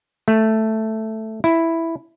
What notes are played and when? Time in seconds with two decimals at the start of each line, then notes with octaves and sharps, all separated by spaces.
0.28 A3
1.44 E4